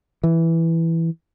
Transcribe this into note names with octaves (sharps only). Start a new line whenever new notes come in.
E3